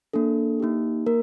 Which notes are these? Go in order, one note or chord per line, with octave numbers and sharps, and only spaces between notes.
A#3 D4 A4
A#3 D#4 G4
A#3 A#4